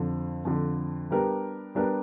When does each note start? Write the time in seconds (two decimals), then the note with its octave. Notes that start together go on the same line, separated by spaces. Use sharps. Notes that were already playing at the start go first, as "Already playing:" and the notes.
Already playing: F2 D3 F3
0.45 F2 D3 F3
1.11 G3 B3 D4 G4 A#4
1.75 G3 B3 D4 G4 A#4